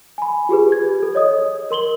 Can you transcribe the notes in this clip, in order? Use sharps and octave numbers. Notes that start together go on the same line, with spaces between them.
G#5 B5
F4 G4 G#4 B4
G#6
A4
C#5 D#5 D#6
A#4 C6 F#7 G7